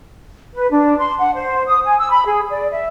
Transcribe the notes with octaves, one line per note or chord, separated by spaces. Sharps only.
B4
D4
C6
F#5
C5
D#6
G#5
E6
B5
G#4
D5
E5